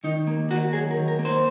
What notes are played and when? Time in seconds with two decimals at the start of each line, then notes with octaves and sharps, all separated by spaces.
0.04 D#3 D#4
0.27 A#3
0.50 D#3 F#4
0.73 F#3 G#4
0.91 A#4
0.96 D#3
1.08 A#4
1.19 A#3
1.25 C5